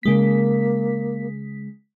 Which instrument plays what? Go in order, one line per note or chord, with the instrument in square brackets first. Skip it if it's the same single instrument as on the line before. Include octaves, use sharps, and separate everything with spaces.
[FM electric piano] C#3 G#3 B6 [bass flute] A#3